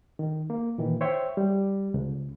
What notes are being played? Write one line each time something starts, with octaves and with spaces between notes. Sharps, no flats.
D#3
A#3
A#2 D#3 E3
C5 C#5 E5 G5
G3
C#2